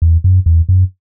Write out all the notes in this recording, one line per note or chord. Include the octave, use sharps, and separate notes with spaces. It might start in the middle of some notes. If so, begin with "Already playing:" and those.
E2
F#2
E2
F#2